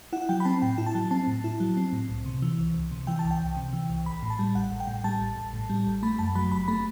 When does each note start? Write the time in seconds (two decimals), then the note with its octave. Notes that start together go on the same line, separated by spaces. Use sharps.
0.13 E4 F#5
0.29 F#3 G5
0.40 B5
0.45 C4 A5
0.62 A2 G5
0.78 E4
0.86 A5
0.95 F#3
1.11 C4 A5
1.27 A2
1.44 E4
1.60 F#3
1.77 C4
1.92 A2
2.09 C2
2.26 C3
2.42 E3
2.59 C2
2.74 C2
2.91 C3
3.07 E3 G5
3.19 C2 A5
3.31 G5
3.41 C2
3.57 C3
3.73 E3
3.89 C2
4.06 A1 B5
4.22 A2
4.30 A5
4.39 G3
4.55 A1 F#5
4.72 A1
4.80 G5
4.87 A2
5.04 G3 A5
5.21 A1
5.36 A1
5.53 A2
5.70 G3
5.86 A1
6.03 A3 B5
6.19 F#2 A5
6.35 F#3 B5
6.52 G1 B5
6.68 A3 B5